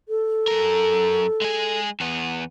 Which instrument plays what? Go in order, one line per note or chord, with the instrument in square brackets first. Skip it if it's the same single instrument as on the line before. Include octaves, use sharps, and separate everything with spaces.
[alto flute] A4
[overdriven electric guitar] F#2 A#4
G#3 G#4
E2 B3